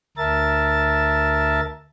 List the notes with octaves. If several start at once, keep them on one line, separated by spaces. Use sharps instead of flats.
D2 A#4 E5 A5 A6